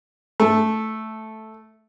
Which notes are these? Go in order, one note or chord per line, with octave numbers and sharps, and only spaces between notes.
A3